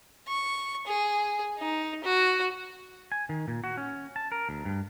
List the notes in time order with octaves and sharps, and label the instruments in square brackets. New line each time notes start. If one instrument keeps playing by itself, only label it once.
[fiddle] C#6
G#4
D#4
F#4
[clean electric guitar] G#5
D#3
A#2
F#4
C#4
A5
A#4
D2
G2